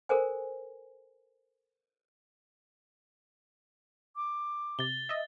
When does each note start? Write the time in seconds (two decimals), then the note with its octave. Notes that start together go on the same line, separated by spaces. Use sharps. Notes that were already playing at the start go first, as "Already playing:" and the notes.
0.09 A4 A#4 C5 G#5
4.16 D6
4.79 C3 A6 G7
5.09 D#5 E5